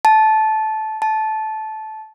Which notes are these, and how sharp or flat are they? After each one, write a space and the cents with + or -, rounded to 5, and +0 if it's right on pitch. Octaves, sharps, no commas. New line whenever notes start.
A5 -15
A5 -15